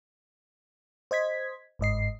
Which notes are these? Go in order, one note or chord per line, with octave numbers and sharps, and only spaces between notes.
C5 D#5 G#6 B6
G1 G#2 D#5 C7